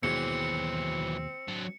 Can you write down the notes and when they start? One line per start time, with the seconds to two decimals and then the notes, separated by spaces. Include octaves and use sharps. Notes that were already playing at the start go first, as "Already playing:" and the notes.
0.03 D#2 B2 E3 F#3 G#3 C4 C#7
1.48 F#3 D4